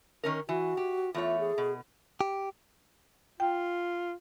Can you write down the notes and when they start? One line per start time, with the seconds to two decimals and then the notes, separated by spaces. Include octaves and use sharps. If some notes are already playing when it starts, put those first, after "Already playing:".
0.24 D#3 C#4 A#4
0.49 E3 F#4
0.77 G4
1.14 E2 A3 F4 C#5
1.39 G#4
1.58 B2
2.21 G4
3.40 F4 G5